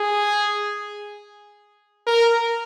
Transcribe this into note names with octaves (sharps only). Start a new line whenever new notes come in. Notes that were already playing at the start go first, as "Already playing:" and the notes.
Already playing: G#4
A#4